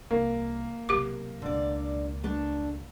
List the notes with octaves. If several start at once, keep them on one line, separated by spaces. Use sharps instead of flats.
C2 A#3
B1 C3 G4 A#4 D6
C#2 B2 D3 D5
A3 D4 A4